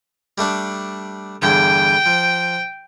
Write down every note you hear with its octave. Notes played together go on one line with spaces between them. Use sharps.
G3 A3 D4
E2 G2 D3 G5
F3